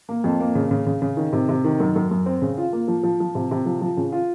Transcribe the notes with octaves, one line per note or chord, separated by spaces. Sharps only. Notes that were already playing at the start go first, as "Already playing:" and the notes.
A#3
F2
A#3
C#3
C#3
C#3
C#3
D#3
C3
C3
D#3
F#2
F#2
F#2
C4
C#3
F4
A#3
F3
F3
F3
C3
C3
F3
F3
C#3
F4